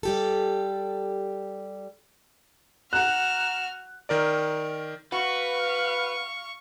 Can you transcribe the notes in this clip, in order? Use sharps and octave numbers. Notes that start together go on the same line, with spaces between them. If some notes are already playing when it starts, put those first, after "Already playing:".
G3 G4 A4
F#4 F#5 A#5 F6 F#6 E7
D#3 A#4 D5
F#4 B4 F5 C#6